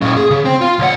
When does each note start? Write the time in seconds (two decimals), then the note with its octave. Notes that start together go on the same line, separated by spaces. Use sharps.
0.02 A#2 C#4
0.16 G#4
0.30 C#3
0.45 C4
0.61 F4
0.79 C#2 F#5